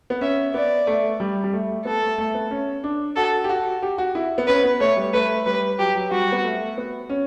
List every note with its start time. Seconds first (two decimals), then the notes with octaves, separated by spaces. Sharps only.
0.10 B3
0.21 C#4 E5
0.54 B3 D5
0.87 A3
1.20 G3
1.44 G3
1.53 A3
1.85 B3 A4
2.02 A3
2.18 A3
2.35 B3
2.51 C#4
2.84 D4
3.16 F#4 A4
3.44 G4
3.49 F#4
3.83 G4
3.98 F#4
4.15 E4
4.38 B3
4.47 C#4 B4
4.64 B3
4.80 A3 C#5
4.97 G3
5.13 A3 B4
5.46 G3 B4
5.79 F#3 G4
5.95 F#3
6.11 G3 F#4
6.32 B3
6.44 A3
6.78 B3
7.10 C#4